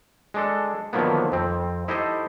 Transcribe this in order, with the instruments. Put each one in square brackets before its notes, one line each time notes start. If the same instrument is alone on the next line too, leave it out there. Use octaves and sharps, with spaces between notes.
[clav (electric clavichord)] G#3 D4 A4
D3 D#3 F3 F#3 A#3 B3
F2 C4
D#4 E4 G4 A4 C5 D#5